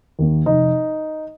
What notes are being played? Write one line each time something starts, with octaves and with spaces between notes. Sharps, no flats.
D#2 D#3 A#3
F1 D#4 D#5